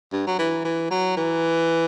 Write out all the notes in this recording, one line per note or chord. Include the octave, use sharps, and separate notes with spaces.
G2
F#3
E3
E3
F#3
E3